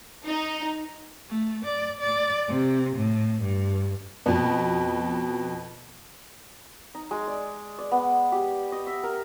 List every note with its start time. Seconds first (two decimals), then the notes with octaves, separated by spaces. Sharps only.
0.26 D#4
1.29 A3
1.65 D5
2.01 D5
2.48 C3
2.96 A2
3.42 G2
4.26 F2 B2
6.95 D#4
7.11 G#3
7.27 D5
7.79 D5
7.91 B3
8.32 G4
8.72 D#5
8.87 E5
9.03 A#4